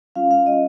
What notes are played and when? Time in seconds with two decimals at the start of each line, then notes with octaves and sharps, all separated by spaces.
0.16 G3 C#4 F4 F5
0.31 F5
0.46 D#5